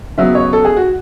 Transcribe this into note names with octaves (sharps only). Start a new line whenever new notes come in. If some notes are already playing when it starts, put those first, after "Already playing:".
C#3 F#3 B3 E5
C#5
A4
G#4
F#4